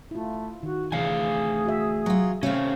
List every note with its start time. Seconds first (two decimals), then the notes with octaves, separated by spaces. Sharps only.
0.11 A3 E4 F4
0.63 D#3 F#4
0.92 D2 C3 E3 A3 G#4 F5 G#5
1.66 F#4 E5
2.06 F#3 F4
2.43 C3 D#3 A3 C4 C#4 C#5 F5